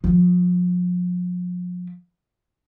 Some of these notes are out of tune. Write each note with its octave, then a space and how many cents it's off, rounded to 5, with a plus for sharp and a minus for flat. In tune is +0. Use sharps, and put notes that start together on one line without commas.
F3 +40